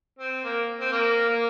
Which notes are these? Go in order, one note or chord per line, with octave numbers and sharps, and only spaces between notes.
C4
A#3
C4
A#3
A#3